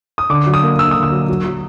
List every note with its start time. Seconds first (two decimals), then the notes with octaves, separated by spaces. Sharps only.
0.18 D#6
0.30 D3 D6
0.47 F#3
0.54 D#6
0.63 A#3
0.79 D3 E6
0.91 D3 D#6
1.03 E6
1.12 F#3
1.29 F#3
1.45 F#3